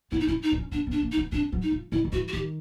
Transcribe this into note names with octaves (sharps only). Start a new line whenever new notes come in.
B3 E4
D#4
C#4 E4
D#4
D4
C#4
B3 D4
B3
D4
A#3
D#4
B3
C4 D4
F#3
D#4
F3
D#3 E4
D#3
E3 F#4
F#4
D#3 G4